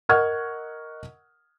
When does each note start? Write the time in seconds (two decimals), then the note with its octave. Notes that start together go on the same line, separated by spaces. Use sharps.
0.09 A#4 D#5 F#5 C#6 F6 G#6